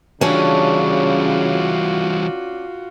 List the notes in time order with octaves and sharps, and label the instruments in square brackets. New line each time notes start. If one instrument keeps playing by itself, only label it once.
[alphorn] C#3 [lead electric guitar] E3 G3 [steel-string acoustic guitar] C#4 D4 [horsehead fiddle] F4 F#4